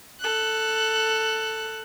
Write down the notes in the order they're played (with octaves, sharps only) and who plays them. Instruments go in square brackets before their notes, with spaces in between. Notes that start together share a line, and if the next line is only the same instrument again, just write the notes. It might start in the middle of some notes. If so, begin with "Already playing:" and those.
[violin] A4 F#6